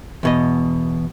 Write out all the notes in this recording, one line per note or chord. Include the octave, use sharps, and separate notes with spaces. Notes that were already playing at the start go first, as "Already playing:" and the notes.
E2 B2 D#5